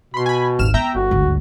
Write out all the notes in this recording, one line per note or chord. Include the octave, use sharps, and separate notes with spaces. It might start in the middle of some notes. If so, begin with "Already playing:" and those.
B2 B5 C6
G#5 B5
G#1 D#2 F6 E7
B3 E5 G5 A#5
G1 F#4
G#1 D2